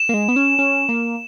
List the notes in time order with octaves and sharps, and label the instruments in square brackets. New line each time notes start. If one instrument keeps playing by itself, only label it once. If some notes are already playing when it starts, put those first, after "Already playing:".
Already playing: [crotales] E7
[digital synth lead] A#3
G#3
B3
C#4
C#4
A#3